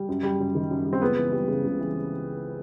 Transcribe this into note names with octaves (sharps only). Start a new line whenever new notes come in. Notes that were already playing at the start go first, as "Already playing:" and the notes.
Already playing: G3
F#2
G3
F#2
D#3
F#2
G3
C4
C#2 B3
E3
G3
C#3
C#2
E3